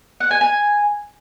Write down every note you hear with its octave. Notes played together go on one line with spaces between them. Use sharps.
F#5
G#5
G#5